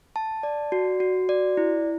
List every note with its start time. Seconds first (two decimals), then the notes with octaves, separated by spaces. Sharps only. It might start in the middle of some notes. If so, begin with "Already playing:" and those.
0.16 A5
0.43 D5
0.72 F#4
1.00 F#4
1.29 D5
1.57 E4